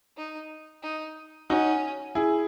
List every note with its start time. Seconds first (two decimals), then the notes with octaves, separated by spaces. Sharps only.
0.17 D#4
0.83 D#4
1.49 C#4 D#4 F#4
2.15 E4 G#4